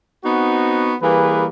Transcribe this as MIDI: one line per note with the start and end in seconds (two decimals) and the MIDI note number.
0.24 0.94 59
0.24 0.94 60
0.24 0.94 63
0.24 0.94 66
1.01 1.46 52
1.01 1.46 55
1.01 1.46 58
1.01 1.46 68
1.01 1.46 71